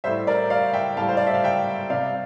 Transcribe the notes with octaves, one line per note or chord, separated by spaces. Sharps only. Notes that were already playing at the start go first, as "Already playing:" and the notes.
A2 G3 C5 E5
A#4 D5
D5 F5
E5 G5
A2 G3 F5 A5
C5
D5
E5
F5
E5 G5
C3 G3 D5 F5